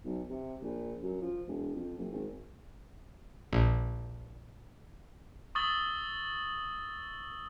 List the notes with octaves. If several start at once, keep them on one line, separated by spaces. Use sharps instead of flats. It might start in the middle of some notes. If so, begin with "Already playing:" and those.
B1
C3
A#1
F#2
F3
E1
F2
F#1
G#1
A#1
C#6 D#6 E6 A6 F#7 G7